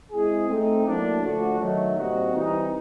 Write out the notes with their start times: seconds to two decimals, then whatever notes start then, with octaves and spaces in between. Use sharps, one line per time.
0.11 G#3 C4 E4 G#4
0.48 A3 C4 D#4
0.85 A2 F#3 A#3 D4
1.22 D3 F3 A3 D4 F#4
1.59 D#3 F#3 A3
1.96 A#2 G3 C4 D#4 F#4
2.33 E3 G3 C4 D#4